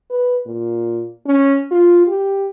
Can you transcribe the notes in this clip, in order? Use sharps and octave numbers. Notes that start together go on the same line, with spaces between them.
B4
A#2
C#4
F4
G4